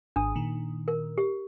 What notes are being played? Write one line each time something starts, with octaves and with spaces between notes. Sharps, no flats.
G#1 D4 D#6
A#2 D#3
A#4
G4